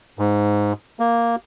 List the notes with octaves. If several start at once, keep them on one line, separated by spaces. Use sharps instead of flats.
G#2
A#3